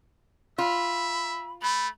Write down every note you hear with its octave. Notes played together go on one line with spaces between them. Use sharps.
F4 E5 B5
A3 B5